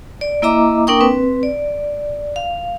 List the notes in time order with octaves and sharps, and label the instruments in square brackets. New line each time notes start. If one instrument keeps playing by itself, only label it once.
[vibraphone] D5
A#3 E4 D#5 E5 A#5 D6
A#3 D4 A#4 G5 C#6 D#6
C4 B4
D5
F5